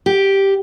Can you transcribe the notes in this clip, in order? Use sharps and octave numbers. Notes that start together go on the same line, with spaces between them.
G4